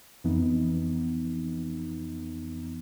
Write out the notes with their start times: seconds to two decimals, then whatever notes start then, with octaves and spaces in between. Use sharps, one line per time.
0.24 F2 E3 B3 D#4